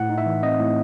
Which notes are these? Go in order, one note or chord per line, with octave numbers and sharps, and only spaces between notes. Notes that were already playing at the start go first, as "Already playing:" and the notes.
Already playing: A2 F#5
D#4
E5
E3
C4 D#5
A2